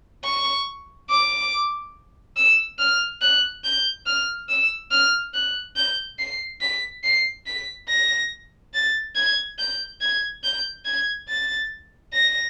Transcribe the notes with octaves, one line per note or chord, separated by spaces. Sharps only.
C#6
D6
E6
F6
F#6
G6
F6
E6
F6
F#6
G6
C7
B6
C7
B6
A#6
A6
G#6
G6
G#6
G6
G#6
A6
A#6